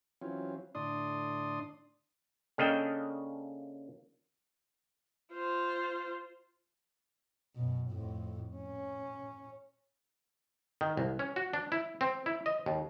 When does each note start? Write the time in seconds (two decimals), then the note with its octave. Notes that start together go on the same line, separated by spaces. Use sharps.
0.22 E3 F#3 C4 C#4 F4
0.75 A2 D3 D4 D5 C6 D#6
2.58 C#3 A#3 D4 A4 D#5 G5
5.33 F4 C5
7.55 F#2 B2
7.89 F2 A2
8.55 C#4
10.81 D#3
10.97 C2
11.19 C#4
11.36 F#4
11.53 D4
11.72 E4
12.01 C4
12.26 E4
12.46 D#5
12.66 D#2